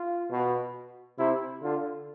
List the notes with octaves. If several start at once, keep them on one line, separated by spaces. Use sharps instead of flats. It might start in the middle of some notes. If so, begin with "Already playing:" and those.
Already playing: F4
B2
C3 E4
D3 F4